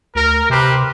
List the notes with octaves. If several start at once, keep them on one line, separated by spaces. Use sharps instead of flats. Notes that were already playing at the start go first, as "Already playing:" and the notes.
D2 A#4
C3 G4 B4 C5